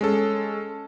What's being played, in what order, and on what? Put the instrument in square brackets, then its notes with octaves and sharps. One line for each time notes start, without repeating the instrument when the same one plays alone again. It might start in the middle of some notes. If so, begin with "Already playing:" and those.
[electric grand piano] G#3 C#4 A4